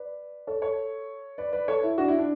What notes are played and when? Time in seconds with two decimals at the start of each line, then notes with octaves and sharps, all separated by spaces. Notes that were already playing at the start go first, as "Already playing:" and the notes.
Already playing: B4 D5
0.47 A4 C#5
0.62 A4 C#5
1.38 B4 D5
1.52 B4 D5
1.68 A4 C#5
1.83 E4
1.98 D4 F#4
2.08 E4
2.19 D4